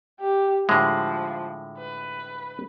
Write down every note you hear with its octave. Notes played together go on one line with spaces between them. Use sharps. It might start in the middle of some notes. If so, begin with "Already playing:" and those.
G4
A2 D3 F3 G#3
B4